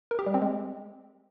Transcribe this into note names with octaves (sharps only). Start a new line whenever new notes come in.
A#4
G4
G3
C4
G#3